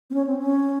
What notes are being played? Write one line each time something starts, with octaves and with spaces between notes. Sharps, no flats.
C4
C#4
C4
C#4